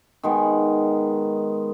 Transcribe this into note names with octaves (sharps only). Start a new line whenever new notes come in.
D#3 G#3 B3